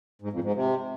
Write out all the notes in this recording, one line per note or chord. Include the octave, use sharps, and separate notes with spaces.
G#2
F2
G#2
C3